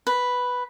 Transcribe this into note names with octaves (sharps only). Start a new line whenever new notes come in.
B4